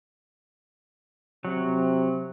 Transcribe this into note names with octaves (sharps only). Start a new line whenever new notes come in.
C3 F#3